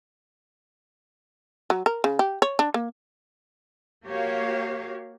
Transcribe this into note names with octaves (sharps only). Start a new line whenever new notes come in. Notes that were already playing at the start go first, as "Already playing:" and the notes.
F#3
A#4
C#3
G4
C#5
D4
A#3
A#3 F#4 G4 C#5 F5